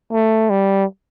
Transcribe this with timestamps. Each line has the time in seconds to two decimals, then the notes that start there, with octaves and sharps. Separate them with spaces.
0.13 A3
0.50 G3